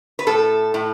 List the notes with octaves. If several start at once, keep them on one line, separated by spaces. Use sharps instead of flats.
B4
A2 A4
A2